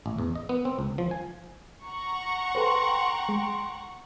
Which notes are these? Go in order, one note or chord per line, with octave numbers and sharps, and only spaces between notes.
A1
E2
D#5
B3
C4
C#2
F3
G#5
F#5 A#5 C#6
A4 B4 C5 G5 C6
G#3